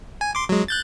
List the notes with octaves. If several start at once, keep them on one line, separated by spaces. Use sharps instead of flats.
G#5
C6 D6
F#3 G#3
F#6 G6 A6